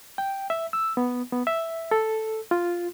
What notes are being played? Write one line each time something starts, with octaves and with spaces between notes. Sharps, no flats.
G5
E5
E6
B3
B3
E5
A4
F4